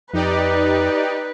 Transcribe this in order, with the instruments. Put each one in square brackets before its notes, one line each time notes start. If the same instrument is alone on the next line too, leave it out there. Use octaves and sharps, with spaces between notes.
[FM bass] F2 [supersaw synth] D#4 G4 D5 [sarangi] B4